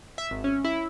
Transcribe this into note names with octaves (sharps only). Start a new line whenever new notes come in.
E5
G#1
C#4
E4